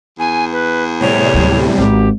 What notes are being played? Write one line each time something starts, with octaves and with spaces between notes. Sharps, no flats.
E2 G#5
B4
A2 C3 G3 C#5
D2 F#3
G#1 G4